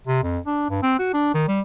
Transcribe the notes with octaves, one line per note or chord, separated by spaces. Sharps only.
C3
F2
D4
G2
C4
F#4
D4
D#3
G3